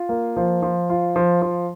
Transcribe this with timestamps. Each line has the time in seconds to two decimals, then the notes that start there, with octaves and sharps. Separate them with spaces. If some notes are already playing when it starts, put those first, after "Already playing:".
Already playing: F4
0.09 A#3
0.37 F3
0.62 F3
0.90 F4
1.16 F3
1.42 F3